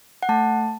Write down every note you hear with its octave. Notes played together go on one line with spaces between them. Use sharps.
F#5
A3 A5